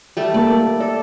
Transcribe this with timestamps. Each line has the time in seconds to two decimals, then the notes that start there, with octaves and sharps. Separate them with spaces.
0.17 G3 A3
0.34 A3 A#3 A4 D5
0.80 A4 D5